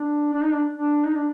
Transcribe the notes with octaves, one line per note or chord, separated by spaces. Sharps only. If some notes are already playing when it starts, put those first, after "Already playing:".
Already playing: D4
D4
D#4
D4
D4
D#4
D4